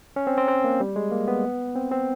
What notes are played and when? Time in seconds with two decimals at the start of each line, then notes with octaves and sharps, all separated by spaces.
0.16 C#4
0.27 C4
0.37 C4
0.48 C4
0.64 A#3
0.80 G3
0.96 G#3
1.11 A#3
1.28 B3
1.76 C4
1.92 C4